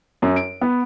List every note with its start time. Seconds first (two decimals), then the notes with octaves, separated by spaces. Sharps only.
0.22 F#2
0.36 D7
0.61 B3